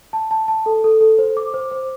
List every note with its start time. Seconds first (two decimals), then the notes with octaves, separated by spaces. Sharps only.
0.13 A5
0.31 A5
0.48 A5
0.66 A4
0.84 A4
1.01 A4
1.18 C5
1.37 D6
1.54 C5
1.71 C5